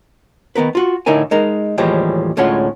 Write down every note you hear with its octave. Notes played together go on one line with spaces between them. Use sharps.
D#3 B3 A#4 B4
F4 F#4
A2 D3 D#4 E4 A#4 G#5
G#3 D#4 A#4
D#2 A2 E3 F3 G3 G#3
D2 A2 G#3 C#4 F4 F#5